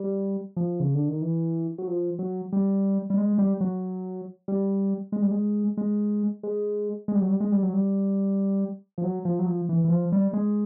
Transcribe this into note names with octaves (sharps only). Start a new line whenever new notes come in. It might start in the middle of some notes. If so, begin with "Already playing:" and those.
Already playing: G3
F3
C#3
D3
D#3
E3
F#3
F3
F#3
G3
G3
G#3
G3
F#3
G3
G#3
G3
G#3
G#3
G#3
G#3
G3
F#3
G3
G#3
G3
F#3
G3
F3
F#3
F3
F#3
F3
E3
E3
F3
G3
G#3